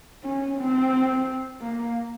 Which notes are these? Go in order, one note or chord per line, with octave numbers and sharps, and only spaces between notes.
C#4
C4
A#3